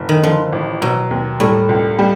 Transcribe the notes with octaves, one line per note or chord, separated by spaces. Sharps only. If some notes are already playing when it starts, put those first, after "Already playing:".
Already playing: F#1
D#3
D3 F3
A1
B2 F#3
D#2
A2 G3
C#2
G3